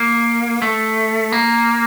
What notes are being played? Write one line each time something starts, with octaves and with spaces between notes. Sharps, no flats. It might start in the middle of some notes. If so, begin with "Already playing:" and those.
Already playing: A#3
A3
A#3